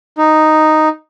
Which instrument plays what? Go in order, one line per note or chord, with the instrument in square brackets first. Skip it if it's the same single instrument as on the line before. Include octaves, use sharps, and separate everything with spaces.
[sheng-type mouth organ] D#4